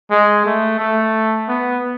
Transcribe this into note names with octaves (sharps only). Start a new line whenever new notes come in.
G#3
A3
A3
B3